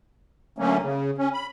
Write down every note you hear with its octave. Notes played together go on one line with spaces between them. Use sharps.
D3 F#3 A3 A#3 C#4
C#3
C#4
B5